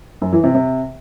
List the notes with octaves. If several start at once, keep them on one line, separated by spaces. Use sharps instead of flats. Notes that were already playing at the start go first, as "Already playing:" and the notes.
F#2
E3
C3
C3